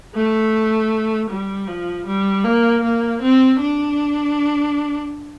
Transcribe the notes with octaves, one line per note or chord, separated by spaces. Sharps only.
A3
G3
F3
G3
A#3
A#3
C4
D4